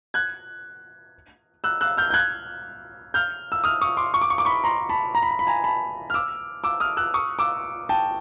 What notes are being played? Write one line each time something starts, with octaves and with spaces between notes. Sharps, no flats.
F#6 G#6
E6 F#6
E6 F#6
F6 G6
G6
F#6 G#6
F6 G6
E6
D#6 F6
C#6 D#6
C6 D6
C#6
D6
C#6
D6
B5 C#6
A#5 C6
A5 B5
A#5
B5
A#5
B5
G#5 A#5
A5 B5
F6
D6 E6
D6 E6
D#6 F6
E6 F#6
C#6 D#6
D6 E6
G5 A5